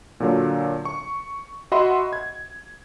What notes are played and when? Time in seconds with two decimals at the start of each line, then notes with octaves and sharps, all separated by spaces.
0.20 A#2 D3 F#3
0.85 C#6
1.72 F#4 D#5 E5 F#5 B5 C6
2.13 G#6